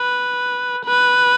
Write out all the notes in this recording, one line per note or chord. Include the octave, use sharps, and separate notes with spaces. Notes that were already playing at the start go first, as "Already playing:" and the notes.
Already playing: B4
B4